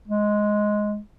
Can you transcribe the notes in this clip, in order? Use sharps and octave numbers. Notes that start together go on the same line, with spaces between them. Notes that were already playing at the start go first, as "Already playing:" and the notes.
G#3